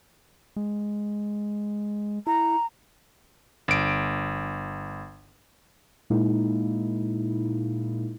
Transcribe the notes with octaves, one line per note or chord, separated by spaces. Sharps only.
G#3
E4 A#5
G1 D7
A#2 G#3 A#3 D#4 E4